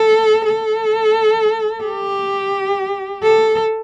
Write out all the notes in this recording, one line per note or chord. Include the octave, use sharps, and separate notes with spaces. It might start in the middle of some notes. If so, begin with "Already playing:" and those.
Already playing: A4
A4
G4
A4